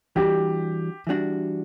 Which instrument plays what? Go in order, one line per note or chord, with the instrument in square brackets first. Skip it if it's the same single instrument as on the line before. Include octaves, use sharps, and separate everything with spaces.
[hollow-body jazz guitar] E3 G3 D4 F#4 [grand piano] G4
[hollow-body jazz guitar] E3 G3 D4 F#4